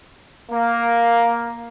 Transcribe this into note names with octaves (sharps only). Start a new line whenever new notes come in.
A#3